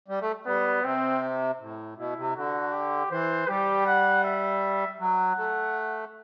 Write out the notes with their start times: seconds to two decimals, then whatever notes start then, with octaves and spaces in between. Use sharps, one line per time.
0.08 G3
0.21 A3
0.46 G3 B3
0.84 C3 C4
1.60 A2
1.97 B2 E4
2.17 C3
2.35 D3 F#4
2.73 G4
3.10 E3 C5
3.48 G3 G4
3.86 F#5
4.24 E5
4.99 F#3 F#5
5.37 A3